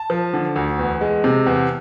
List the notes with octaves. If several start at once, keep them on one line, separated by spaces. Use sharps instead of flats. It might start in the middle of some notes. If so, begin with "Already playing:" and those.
Already playing: A5
F3
D3
D2
E2
G#3
C3
E2